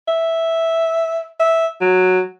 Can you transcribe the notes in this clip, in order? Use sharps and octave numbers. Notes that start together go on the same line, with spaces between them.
E5
E5
F#3